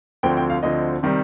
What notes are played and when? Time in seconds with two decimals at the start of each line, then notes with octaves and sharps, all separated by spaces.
0.23 D2 D3 F3 C4 G5
0.37 G5
0.50 F5
0.63 D2 D3 F3 C4 D#5
1.03 C3 D#3 G3